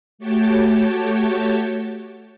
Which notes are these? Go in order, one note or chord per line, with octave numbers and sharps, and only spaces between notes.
A3 F#4 G4 C#5 G5 A5